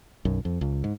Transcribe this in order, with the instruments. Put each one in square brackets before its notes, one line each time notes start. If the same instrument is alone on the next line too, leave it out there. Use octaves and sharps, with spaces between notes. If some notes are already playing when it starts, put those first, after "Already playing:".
[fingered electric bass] B1 F#2
F2
C#2
G#2